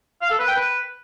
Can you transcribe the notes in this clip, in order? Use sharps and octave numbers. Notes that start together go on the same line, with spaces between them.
F5
A4
B4
G5
B4